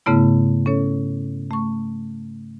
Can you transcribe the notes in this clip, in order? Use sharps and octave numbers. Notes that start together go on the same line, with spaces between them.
G#2 C#3 A3 B3 E4
C#4 A4 C#5
A3 C#6